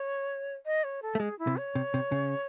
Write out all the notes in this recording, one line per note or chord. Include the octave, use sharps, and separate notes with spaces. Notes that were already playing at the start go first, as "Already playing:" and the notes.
Already playing: C#5
D#5
C#5
A4
A3
G#3 G#4
E4
C3
C#5
C3
C3
C#3